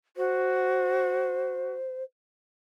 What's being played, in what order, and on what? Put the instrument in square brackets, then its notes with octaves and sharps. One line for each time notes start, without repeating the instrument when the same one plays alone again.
[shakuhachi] F#4 [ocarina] C5